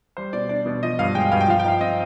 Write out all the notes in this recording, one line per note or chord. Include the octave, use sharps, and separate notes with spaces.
G3 C5
B2 D5
D4 D5
B2
F3 D#5
G2 F5
G#3 G5
G2 F5
G5
F3 F5
G5
D#4 F5
C4 D#5